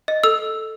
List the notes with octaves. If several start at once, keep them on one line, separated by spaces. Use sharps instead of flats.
D#5
A4 E6